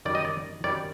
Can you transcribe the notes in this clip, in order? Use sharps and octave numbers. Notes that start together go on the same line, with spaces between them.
F#2 D#3 G3 D5
D#5
D5
F#2 D#3 G3 D5